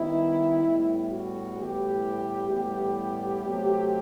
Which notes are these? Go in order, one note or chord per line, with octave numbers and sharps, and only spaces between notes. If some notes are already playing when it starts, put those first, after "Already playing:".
Already playing: D#3 G3 B3 E4
A2 G3 B3
F#4
A2 E3 G3 B3 G4
A2 E3 G3 B3 G4
C3 F#3 A3